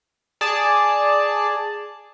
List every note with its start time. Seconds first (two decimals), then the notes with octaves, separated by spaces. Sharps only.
0.41 G#4 D5 A5